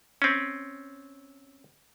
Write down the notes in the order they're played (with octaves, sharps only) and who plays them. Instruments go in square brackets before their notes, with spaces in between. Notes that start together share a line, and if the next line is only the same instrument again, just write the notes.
[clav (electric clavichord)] C4 C#4